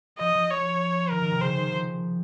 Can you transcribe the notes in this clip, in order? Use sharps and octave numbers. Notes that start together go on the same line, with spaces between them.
F3 D#5
F3
C#5
D#3 A#4
D#3
C3
C#3 C5
D#3
D#3
F3